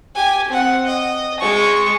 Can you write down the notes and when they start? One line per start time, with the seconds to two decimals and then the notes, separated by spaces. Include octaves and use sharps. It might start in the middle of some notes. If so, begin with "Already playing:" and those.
0.15 G4 G#5
0.48 C4 F#5
0.86 D#5
1.40 G#3 C#6